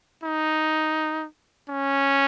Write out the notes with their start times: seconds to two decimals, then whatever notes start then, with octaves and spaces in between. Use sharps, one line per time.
0.23 D#4
1.69 C#4